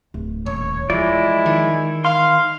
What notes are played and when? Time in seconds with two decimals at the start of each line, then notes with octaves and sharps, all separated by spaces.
0.14 D1
0.46 D#1 C#5
0.90 E3 F3 G#3 E4 D5
1.46 D#3
2.05 F5 C6